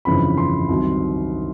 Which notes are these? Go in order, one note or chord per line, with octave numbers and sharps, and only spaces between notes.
G1 F2 C#3 E3 B5
C6
C2 C3 D#3 F#3